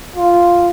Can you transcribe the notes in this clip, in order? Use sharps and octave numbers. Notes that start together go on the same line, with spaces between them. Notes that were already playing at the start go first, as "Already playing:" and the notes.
F4